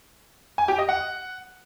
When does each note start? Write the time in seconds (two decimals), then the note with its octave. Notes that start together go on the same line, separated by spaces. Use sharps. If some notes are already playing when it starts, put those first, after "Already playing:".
0.58 G#5
0.68 G4
0.78 D#5
0.89 F#5